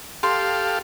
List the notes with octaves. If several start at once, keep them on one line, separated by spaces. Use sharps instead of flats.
G4 A4 F5 C6